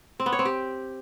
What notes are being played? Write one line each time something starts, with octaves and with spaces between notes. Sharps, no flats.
C4
B3
C#5
C4
G4